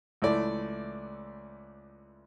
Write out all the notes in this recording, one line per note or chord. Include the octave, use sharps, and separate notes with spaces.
C#2 E3 A3 E4 D5